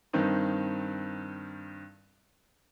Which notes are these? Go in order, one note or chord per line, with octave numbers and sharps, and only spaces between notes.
G2 D#3 C4 D#4